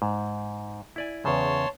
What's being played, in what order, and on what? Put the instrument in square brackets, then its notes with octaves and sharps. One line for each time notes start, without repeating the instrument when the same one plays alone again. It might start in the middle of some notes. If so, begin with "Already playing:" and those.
[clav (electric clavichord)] G#2
E4 D5 G#5
[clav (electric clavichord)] E2 C#3 [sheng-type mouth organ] C#5 A5 C6